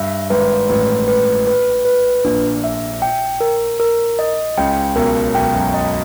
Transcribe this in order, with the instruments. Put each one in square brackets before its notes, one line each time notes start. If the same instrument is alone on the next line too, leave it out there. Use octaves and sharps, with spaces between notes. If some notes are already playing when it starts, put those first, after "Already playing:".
Already playing: [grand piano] G2 [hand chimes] E5
[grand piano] G#1 G#2 [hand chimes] B4
[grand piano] A1 A2 [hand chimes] B4
[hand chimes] B4
B4
B4
[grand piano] A#1 A#2 [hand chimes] D4
[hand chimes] E5
G5
A#4
A#4
D#5
[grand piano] C#2 C#3 [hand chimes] G5
[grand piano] B1 B2 [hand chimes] A#4
[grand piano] B1 B2 [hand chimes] G5
[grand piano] F#2
[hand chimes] D#5